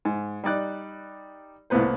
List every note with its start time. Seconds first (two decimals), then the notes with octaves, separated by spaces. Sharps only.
0.05 G#2
0.44 G3 D#4 D5 F#6
1.70 C2 A2 A#3 B3 B4 C5